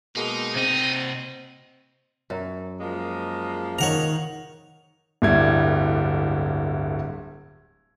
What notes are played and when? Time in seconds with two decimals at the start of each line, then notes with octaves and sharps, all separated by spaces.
0.16 B2 G#3 A#3 D#4
0.56 C3 C4 D#5
2.30 F#2
2.80 F3 G#3 A#3
3.79 D#3 C#5 F#5 A#5
5.22 D1 G1 G3 E4 G#6